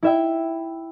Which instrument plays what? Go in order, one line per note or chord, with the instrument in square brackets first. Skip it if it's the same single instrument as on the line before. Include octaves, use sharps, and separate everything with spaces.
[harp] E4 E5 G5